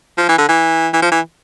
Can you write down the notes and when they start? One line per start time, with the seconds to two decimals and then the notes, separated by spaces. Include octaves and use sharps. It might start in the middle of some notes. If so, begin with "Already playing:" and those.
0.18 F3
0.29 E3
0.38 D3
0.49 E3
0.93 E3
1.02 F3
1.12 E3